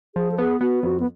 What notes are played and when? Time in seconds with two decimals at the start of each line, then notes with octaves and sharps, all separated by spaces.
0.15 F3 G#4
0.32 A4
0.38 B3 G#4
0.61 B3 F#4
0.83 F2 F#4
1.00 B3